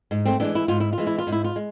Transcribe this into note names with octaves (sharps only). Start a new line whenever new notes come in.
G#2
A3 C4
E3 G#3 B3 D4
E4
G#2 F4
E4
F4
E3 G#3
E4
F4
G#2
E4
F4
G#3